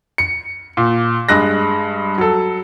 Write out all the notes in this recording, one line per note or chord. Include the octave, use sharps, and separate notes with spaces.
C#7
A#2
G2 G#3 F#6 A#6
F#3 A4